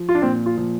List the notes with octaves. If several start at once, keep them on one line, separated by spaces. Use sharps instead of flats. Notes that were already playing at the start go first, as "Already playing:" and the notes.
Already playing: F3
F4
D4
A#2 C4
F4
F3